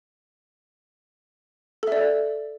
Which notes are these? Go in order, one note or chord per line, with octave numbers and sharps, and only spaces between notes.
A4 D5 E5